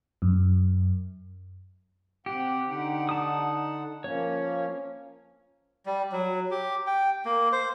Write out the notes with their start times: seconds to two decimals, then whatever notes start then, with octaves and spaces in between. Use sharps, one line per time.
0.22 F#2
2.26 C3 G4 F#5
2.68 D3 D#4 F#5
3.09 A5 D#6
4.04 F3 A#3 C#4 C#5
5.86 G3
6.12 F#3
6.51 G4
6.87 G5
7.25 A#3
7.52 C5